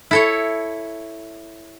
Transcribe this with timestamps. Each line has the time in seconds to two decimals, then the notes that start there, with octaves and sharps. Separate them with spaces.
0.11 E4 A4 C#5